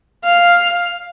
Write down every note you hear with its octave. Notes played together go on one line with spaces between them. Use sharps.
F5